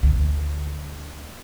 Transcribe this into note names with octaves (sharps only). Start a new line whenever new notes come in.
D2 D3